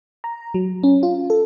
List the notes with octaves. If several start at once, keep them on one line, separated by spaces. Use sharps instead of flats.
A#5
F#3
C#4
F4
A4